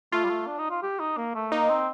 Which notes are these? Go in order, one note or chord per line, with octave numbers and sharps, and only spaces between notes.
A3 F4
G3
A3
D4
D#4
F4
G4
D#4
A#3
A3
A#3 D#4
C4